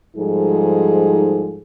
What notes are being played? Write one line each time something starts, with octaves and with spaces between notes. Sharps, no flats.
G#2 F3 G3 D#4 G#4 A4